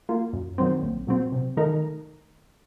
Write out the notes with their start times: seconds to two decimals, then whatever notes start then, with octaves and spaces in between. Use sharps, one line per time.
0.09 A#3 F4
0.33 F#2
0.58 D#3 F#3 C4
0.83 A#1
1.07 A#2 F#3 C4
1.32 C3
1.57 D#3 A3 D#4 A#4